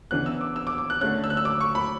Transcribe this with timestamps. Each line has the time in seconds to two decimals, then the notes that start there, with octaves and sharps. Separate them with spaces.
0.11 C#3 E3 B3 D4 F#6
0.26 E6
0.41 D6
0.56 E6
0.67 D6
0.78 D6
0.90 F#6
1.01 D3 A3 C#4 F#6
1.24 E6
1.30 F#6
1.37 E6
1.45 D6
1.61 C#6
1.75 B5